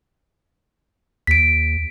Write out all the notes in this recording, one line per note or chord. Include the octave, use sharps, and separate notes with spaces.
D#2 B6 D7